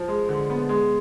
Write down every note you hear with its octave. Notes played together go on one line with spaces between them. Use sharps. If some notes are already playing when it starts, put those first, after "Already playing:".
Already playing: F3
G#3
D3
B3
G#3